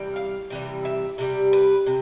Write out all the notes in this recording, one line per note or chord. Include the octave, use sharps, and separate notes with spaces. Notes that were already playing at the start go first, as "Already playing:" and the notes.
Already playing: C3 E3 G3
F5
C3 E3 G3
E5
C3 E3 G3
B4
C3